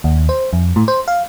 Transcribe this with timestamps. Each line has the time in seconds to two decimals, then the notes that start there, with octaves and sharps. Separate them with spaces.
0.04 D#2
0.29 C5
0.53 F2
0.76 A2
0.88 C5
1.08 F5